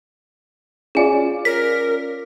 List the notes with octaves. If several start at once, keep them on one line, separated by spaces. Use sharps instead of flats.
C#4 F4 G#4 D5 G#5
A#4 B6